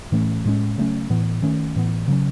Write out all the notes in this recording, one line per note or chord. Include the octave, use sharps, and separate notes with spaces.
A2 E3 A3 C#4
A2 G#3 C#4
C#3 F#3 A3 C#4
A2 E3 B3
D#3 A3 C#4
A2 E3 B3
C#3 F#3 C#4